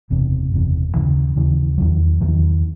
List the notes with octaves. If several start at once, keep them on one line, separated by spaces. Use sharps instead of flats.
F#1 E2 C3
F#1 E2 C3
D#2 C#3 E3
D#2 C#3 E3
E2 D#3 F#3
E2 D#3 F#3